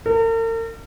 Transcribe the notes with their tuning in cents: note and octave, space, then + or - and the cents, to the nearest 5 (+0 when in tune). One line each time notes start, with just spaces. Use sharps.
A#4 -45